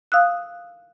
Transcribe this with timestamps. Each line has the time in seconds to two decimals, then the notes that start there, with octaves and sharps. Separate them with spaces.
0.12 F5 D#6 E6 F#6